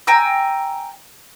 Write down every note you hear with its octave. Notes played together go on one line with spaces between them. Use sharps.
G5 G#5 A#5 E6